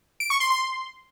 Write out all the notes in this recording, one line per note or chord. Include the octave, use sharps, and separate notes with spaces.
D7
C#6
C6
C6